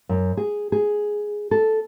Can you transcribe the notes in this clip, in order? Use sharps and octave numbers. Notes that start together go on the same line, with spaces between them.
F#2
G#4
G#4
A4